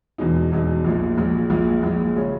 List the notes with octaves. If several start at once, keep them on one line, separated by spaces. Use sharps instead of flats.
E1 E2 B2 G#3 D#4
E1 E2 B2 G#3 D#4
A#1 A#2 G#3
A#1 A#2 G#3
A#1 A#2 G#3
A#1 A#2 G#3
C#3 G#3 C#4